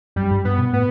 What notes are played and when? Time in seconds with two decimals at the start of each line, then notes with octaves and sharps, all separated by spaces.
0.16 F#2 G3
0.31 G2
0.45 G2 B3
0.58 B2
0.73 A2 B3